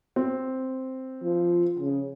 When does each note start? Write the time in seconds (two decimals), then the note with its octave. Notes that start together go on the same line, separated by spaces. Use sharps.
0.16 C4
1.23 F3
1.79 C#3